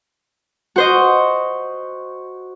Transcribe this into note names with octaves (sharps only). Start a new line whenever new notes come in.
F#4 C5 D#5